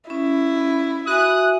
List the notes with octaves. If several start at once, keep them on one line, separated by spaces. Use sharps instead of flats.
C#4 E4
F#4 E5 G#5 D#6 F#6